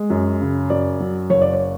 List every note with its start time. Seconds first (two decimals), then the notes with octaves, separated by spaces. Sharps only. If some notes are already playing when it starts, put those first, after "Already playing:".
Already playing: G#3
0.10 F#2
0.41 C#3
0.70 F#2 D5
1.00 F#3
1.30 F#1 C#5
1.42 D5
1.53 C#5